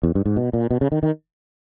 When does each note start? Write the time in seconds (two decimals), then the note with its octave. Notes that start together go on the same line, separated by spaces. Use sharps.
0.03 E2
0.15 G2
0.26 G#2
0.37 B2
0.53 A#2
0.71 B2
0.81 C#3
0.92 D#3
1.03 D#3